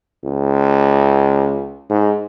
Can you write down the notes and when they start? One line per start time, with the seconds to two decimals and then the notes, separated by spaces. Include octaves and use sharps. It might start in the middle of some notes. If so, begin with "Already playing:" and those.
0.24 C#2
1.90 G#2